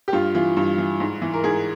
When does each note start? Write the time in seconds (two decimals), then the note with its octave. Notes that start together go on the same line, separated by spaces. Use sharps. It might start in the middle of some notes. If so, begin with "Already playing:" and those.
0.08 G4
0.13 G2 F4
0.35 E3 F4
0.57 G2
0.78 E3
1.00 G#2
1.22 E3
1.34 A#4
1.44 G#2 G#4